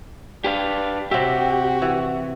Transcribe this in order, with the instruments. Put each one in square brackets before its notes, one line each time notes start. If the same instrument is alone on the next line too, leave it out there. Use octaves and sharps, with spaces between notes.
[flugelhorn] D4 [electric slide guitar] G4 B4 F5
[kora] C3 E5 [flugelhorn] F#4 [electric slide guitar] G4
[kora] E3